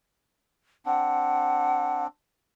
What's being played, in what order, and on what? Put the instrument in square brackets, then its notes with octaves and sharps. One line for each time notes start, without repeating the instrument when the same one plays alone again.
[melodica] C4 D4 [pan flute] F#5